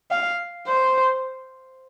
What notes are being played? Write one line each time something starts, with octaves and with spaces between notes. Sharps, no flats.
F5
C5